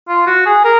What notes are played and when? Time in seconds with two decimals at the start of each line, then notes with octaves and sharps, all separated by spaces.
0.08 F4
0.27 F#4
0.46 G#4
0.65 A#4